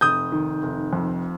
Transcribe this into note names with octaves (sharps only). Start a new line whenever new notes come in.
F1 D#6 G6
D#3
F1
F2